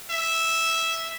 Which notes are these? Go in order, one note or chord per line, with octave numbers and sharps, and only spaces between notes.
E5